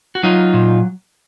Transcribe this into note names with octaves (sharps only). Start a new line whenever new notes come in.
F#4
F#3 D#4 F4
A#2